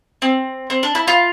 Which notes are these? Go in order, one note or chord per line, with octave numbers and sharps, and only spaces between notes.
C4
C4
D4
E4
F4